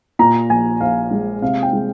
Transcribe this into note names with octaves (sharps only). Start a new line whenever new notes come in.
A#2 A#5
A#1 G#5
A#1 F5
G#3
C3 F5
G5
G#3